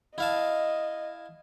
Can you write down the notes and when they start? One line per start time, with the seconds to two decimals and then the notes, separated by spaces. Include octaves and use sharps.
0.18 E4 D#5 F5 A5